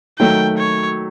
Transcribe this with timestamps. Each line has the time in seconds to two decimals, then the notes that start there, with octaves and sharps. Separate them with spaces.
0.19 D#3 F#3 A3 G5
0.58 C#5